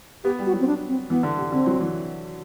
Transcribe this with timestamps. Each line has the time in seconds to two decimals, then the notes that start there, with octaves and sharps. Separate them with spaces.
0.24 B3 G4
0.39 G3
0.46 F#4
0.53 F#3
0.60 C4
0.67 D4
0.89 C4
1.10 E3 B3
1.23 D3
1.38 C3
1.52 D3 C4
1.66 F#3
1.80 E3